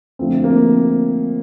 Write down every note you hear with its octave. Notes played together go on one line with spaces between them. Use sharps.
D3 F3 A3 C4
A#3